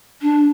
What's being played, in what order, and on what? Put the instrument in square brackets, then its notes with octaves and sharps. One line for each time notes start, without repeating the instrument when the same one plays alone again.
[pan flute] D4